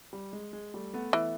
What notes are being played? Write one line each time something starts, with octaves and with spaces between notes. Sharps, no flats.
G3
G#3
G#3
G3 A3
A3 B3
E3